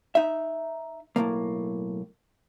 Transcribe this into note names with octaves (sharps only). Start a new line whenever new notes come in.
D#4 E5
B1 A2 C3 A#3